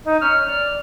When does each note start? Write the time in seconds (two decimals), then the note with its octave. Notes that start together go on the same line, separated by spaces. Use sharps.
0.05 D#4
0.22 C#4 F6
0.46 D5